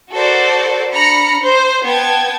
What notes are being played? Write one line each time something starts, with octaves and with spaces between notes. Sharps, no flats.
F#4 A4 A#4 C5 D5
D4 A#5 B5 F6 A#6 C#7
C5
B3 G5 A5 G#6